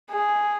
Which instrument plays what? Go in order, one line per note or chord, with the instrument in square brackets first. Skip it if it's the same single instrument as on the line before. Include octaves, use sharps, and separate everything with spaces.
[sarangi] G#4